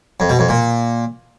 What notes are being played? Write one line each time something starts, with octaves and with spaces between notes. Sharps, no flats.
F2
B2
F2
A#2